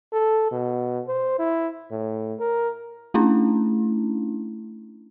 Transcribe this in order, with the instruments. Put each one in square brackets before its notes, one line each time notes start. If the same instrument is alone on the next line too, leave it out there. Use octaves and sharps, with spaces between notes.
[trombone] A4
B2
C5
E4
A2
A#4
[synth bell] A3 C#4 D4 E4